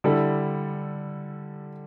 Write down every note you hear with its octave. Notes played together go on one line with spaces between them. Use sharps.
D3 G3 E4 A4